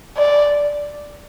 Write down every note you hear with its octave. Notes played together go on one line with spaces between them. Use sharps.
D5